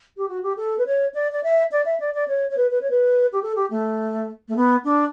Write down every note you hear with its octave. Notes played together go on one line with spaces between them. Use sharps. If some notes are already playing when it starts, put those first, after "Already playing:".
G4
F#4
G4
A4
B4
C#5
D5
D5
E5
D5
E5
D5
D5
C#5
C#5
B4
B4
C#5
B4
G4
A4
G4
A3
A3
B3
D4